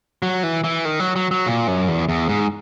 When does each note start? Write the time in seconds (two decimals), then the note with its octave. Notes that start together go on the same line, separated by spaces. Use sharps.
0.23 F#3
0.43 E3
0.64 E3
0.85 D#3
1.00 F#3
1.16 F#3
1.31 F#3
1.46 A#2
1.67 F#2
1.88 E2
2.09 E2
2.29 G#2